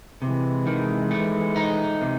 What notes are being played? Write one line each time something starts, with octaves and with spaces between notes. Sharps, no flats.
C3 E3 G#3
D#3
A3
D#4
C3